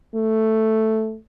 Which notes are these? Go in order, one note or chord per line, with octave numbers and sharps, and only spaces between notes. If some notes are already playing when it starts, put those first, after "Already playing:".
A3